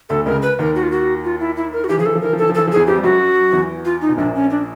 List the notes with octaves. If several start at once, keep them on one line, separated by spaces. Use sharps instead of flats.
D2 D3 A4
C#2 C#3 A#4
B4
D#2 D#3 A#4
F#4
F4
F#4
F4
E4
E4
A#4
F#4
E3 G4
F3 G#4
E3 A4
F3
E3 A#4
F3
E3 A4
F3
E3 A4
F3
E2 E3 G#4
F2 F3 G4
G3
F#2 F#3 F#4
E2 E3
F4
D#4
B2
A#1 A#2 D4
C#4
D4